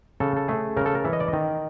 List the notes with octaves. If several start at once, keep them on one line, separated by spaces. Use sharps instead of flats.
C#3 A4
A4
A3 G#4
C#3 A#4
A4
A#4
E3 E5
D#5
D5
D#3 D#5